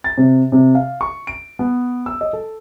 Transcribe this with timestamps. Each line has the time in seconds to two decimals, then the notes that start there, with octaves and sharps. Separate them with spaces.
0.04 A6
0.18 C3
0.52 C3
0.75 F5
1.01 C#6
1.27 D7
1.59 B3
2.06 E6
2.21 D#5
2.33 A4